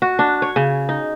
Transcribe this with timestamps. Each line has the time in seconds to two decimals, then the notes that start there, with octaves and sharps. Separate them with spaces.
0.02 F#4
0.19 D4
0.42 C#5
0.56 C#3
0.89 D#4